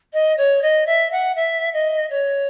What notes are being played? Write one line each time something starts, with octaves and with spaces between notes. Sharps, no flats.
D#5
C#5
D#5
E5
F#5
E5
D#5
C#5